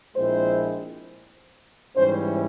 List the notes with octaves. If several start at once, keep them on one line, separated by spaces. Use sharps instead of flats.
A#1 A#2 G#3 C4 E4 C5
G#2 E3 G3 C#4 E4 C5